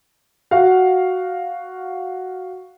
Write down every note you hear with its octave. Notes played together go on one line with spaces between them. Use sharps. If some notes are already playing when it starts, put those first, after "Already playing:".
F#4 F5 F#5